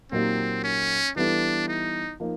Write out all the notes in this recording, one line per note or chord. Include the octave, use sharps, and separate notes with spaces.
A#2 F#3 A#3 C4 D#4 G4
C#4
E3 G3 B3 D4 E4 A4
D#4
F3 A#3 D#4